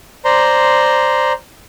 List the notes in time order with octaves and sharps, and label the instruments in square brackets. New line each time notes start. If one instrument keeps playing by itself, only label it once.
[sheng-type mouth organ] C5 D5 A#5 C6